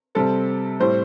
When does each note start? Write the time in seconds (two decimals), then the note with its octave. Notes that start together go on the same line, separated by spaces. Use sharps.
0.15 C3 G3 C4 A4
0.80 A2 G3 C4 C5